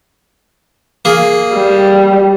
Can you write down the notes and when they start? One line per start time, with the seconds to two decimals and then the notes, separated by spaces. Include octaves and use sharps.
1.05 A#3 G#4
1.54 G3